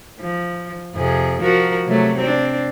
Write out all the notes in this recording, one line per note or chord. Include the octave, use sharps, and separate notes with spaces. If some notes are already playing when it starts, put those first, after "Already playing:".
F3
F2 C3 G#4
F3 F#4 A#4
C3 F#3 A3
C4 D4